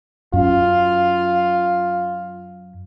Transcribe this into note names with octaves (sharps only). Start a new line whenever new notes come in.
F#2 C#4 F4